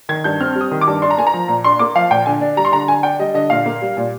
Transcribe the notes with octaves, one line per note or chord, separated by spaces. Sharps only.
D#3 G#6
G2 G6
C4 F6
G3
D#6
D#3
D6
G2
D4 C6
A#5
A#3 G#5
A#5
F3
A#2
D4 C6
A#3 D6
F3 F5
A#2 G5
D3 G#5
D4
G3 A#5
C6
D3 A#5
D3 G#5
D4 G5
G3 D#5
D3 D#5
A#2 F5
A#3
G3
A#2